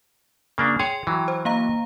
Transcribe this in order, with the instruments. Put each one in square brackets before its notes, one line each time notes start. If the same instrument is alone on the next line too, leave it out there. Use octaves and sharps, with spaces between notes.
[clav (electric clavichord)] C#3 A#3 D4
[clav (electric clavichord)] G#4 C#5 [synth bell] G5 C6
[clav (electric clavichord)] E3 F#3
[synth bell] C5
A#3 F5 A#5